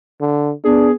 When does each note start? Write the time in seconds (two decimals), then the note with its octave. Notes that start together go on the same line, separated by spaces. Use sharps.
0.21 D3
0.64 B3 D4 G#4